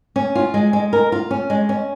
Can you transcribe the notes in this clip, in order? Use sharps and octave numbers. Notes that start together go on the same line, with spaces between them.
C#4
F4
G#3
G#3
A#4
F4
C#4
G#3
C#4